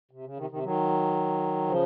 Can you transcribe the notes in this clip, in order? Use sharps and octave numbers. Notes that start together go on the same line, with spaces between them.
C3
C#3
C3 D#3
C3 D#3
D#3 F#3
C#3 F3